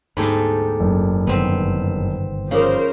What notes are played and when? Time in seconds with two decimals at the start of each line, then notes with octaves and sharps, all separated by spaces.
0.17 D2 G#2 B2 G4 A4 B5
0.80 F#1
1.27 G1 C3 D#3 B3 C4
2.51 C#3 F3 A#4 C5 F5 D6